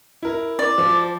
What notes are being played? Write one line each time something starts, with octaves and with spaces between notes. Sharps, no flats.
E4 A#4
D5
F3